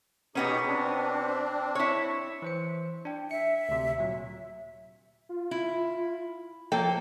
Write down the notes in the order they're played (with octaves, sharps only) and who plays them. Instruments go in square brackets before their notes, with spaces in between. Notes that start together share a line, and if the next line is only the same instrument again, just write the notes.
[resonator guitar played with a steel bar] B2 B3 C#4 [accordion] D#4 G4 G#4
[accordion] C4 D4
[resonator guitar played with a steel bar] E4 C#5
[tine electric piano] E3 C5 C#7
D4 G5
[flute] E5 [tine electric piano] C#7
[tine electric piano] D2 C3
A#2 F#3
[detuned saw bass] F4
[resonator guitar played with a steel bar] E4
[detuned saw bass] F3 [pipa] F#3 G5 [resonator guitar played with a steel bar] A#3 A4